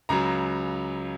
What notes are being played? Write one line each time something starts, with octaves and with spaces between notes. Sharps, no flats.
C#2 C#3 F#3 A#5